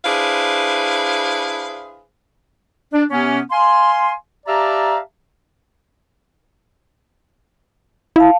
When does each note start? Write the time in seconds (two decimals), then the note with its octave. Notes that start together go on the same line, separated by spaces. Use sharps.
0.05 D4 E4 G#4 B4 C5 F5
2.93 D4
3.11 C3 B3 C#4
3.51 F5 G#5 C6
4.47 G4 D5 E5 F5 A5 A#5
8.16 E4 F5 A5